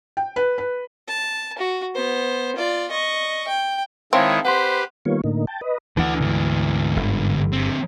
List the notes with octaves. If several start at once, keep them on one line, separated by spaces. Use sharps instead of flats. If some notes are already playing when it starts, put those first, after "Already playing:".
G5
B4
B4
A5
F#4
B3 C5
F4 D5
D#5 C#6
G5
D#3 G#3 C4 E4 C#5 F5 A5
G4 B4 C5 F#5 C6
D#3 G3 A#3 B3 F4 C#5
A2 D3 A#3 D#4
G5 A5
B4 D#5
D2 E3 D4 F#5
G#2 D3
G1
D3 C4